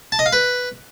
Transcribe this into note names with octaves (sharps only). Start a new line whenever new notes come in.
A5
D#5
F5
B4